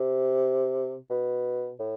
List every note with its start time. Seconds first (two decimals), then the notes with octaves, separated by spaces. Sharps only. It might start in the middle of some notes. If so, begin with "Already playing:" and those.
Already playing: C3
1.11 B2
1.80 A2